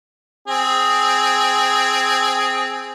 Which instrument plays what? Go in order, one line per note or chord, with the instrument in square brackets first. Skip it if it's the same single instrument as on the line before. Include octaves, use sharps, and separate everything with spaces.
[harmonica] C4 G#4